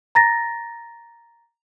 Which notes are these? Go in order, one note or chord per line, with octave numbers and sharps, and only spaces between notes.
A#5 A6 A#6